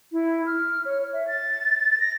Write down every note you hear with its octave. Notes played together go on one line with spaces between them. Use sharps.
E4
F6
C#5
E5
A6
A#6